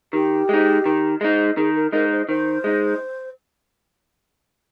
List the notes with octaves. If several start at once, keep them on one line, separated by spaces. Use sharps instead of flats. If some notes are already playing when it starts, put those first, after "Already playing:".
D#3 G4
G#3 D#4
D#3
G#3 D#4
D#3 G#4
A#4
G#3 D#4 A#4
C5
D#3 C5
G#3 D#4